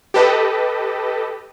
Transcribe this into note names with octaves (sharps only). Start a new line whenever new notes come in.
G4 A4 B4 D#5